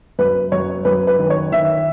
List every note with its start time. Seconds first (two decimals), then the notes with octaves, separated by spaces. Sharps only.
0.19 F#2 B4
0.52 F#2 C#5
0.85 F#2 B4
1.07 B4
1.18 D#3
1.30 C#5
1.51 D#3 E5